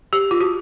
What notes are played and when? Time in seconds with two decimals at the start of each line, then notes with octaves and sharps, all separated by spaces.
0.13 G4
0.31 F4
0.40 F#4